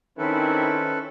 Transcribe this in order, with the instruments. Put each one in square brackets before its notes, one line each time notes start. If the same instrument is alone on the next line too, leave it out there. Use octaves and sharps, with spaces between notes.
[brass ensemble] D#3 C4 E4 [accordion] C#4 A4 B4